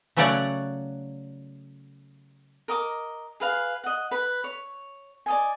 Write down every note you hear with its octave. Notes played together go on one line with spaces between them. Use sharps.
C#3 F#3 A3 C#5 D5 F#5
A#4 D#5 D6
G#4 B4 F5
D#5 F#5
B4 B5
C#5
D5 D#5 G#5